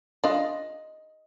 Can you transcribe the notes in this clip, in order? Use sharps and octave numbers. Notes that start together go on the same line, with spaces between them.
D4 F4 D#5